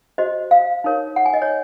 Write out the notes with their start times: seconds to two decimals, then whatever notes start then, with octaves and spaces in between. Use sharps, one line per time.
0.18 F#4 C5 D#5
0.51 F5
0.84 D#4 A#4 C#5
1.16 F#5
1.26 G#5
1.34 D#5
1.42 C#5